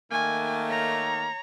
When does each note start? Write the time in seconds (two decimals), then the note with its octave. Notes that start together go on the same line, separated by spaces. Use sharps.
0.11 D#3 A3 A#3 G#5
0.68 C#5 A#5